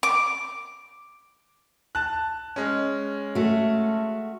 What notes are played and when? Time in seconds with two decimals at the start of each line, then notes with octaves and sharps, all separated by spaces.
0.03 D6
1.95 A5 F#6
2.56 G#3 C#4
3.35 A3 F#4